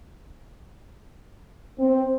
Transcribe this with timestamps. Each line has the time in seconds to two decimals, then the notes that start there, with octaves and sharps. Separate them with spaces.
1.79 C4